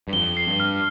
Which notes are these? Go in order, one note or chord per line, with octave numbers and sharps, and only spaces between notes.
G2
F2 G7
C7
G2
F6